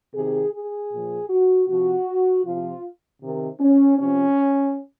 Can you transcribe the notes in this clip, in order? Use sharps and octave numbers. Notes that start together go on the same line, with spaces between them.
C3 D#3 G#4
G#4
A#2 F3
F#4
C3 F3 F#4
C3 F3 F4
C3 D#3
C#4
C3 F3 C#4